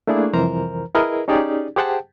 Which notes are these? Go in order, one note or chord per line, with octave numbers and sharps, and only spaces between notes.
A3 A#3 D4 E4 G#4
C2 F2 E3 A#4 C5 A#5
E4 G#4 A#4 B4 D#5
C#4 D#4 G4 G#4 D5
G4 G#4 C5 F#5 G5 A5